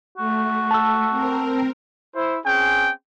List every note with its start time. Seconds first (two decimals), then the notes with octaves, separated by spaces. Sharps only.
0.18 A3 F#4
0.71 A5 E6
1.09 C4 A#4
2.15 E4 C5
2.46 C4 C#4 G#4 G5